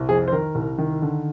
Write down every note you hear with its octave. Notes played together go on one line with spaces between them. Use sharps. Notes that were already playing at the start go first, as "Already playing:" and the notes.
Already playing: C2
F2 G#4
C5
D#3 A#4
C2
D#3
D3